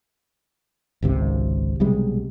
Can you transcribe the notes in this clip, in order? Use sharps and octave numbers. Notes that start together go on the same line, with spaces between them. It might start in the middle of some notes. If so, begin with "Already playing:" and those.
G#1 C#2 C3
B1 C3 G3 G#3